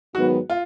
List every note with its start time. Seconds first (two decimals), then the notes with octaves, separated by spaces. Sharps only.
0.15 G#2 D#3 F#3 B3 F#4
0.50 F4